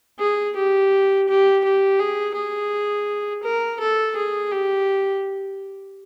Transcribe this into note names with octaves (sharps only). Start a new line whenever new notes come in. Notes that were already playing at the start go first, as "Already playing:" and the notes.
G#4
G4
G4
G4
G#4
G#4
A#4
A4
G#4
G4